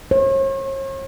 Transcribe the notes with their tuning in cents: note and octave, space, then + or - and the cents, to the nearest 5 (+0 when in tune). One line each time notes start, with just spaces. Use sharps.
C#5 -45